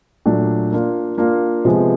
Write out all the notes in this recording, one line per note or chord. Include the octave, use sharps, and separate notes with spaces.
A#2 F#3 A3 D4
A#3 D4 F4
A#3 D4 F4
C3 F3 G#3 B3